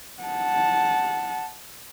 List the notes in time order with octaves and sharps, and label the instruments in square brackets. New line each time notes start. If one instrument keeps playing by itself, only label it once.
[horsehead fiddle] F#5 A5